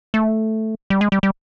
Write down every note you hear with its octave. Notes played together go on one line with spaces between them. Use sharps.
A3
G3
G#3
G3
G3